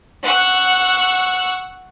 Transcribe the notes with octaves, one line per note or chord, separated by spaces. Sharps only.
F#5 C#6 E6 F#6